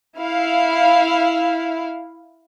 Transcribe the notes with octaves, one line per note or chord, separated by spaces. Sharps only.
E4 F5